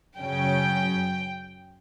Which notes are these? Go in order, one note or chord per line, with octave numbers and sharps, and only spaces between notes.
F#2 C#3 F#3 C#4 G5